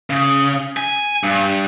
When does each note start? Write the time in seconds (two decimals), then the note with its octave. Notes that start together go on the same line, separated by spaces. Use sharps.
0.10 C#3
0.77 G#5
1.24 G2